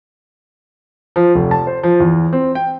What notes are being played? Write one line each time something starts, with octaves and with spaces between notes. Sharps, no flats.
F3
F1
A5
C5
F3
E2
C4
G5